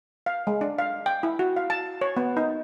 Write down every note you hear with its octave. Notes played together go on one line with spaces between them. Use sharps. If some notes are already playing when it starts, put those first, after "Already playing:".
F5
G#3
D4
F5
G5
E4
F#4
F5
A5
C#5
B3
D#4